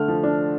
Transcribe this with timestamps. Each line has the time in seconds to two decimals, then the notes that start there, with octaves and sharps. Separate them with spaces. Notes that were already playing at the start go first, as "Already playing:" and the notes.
Already playing: D3 A3 F6
0.08 F3
0.23 D4